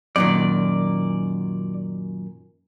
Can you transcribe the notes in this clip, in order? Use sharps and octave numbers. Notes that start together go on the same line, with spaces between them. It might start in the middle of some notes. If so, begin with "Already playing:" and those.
F#2 A#2 D#3 D5